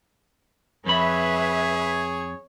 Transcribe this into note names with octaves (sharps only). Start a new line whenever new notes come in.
F2 G#4 B4 C#5 E5 B5